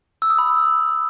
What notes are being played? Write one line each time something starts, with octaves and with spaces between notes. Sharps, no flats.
E6
D#6
B5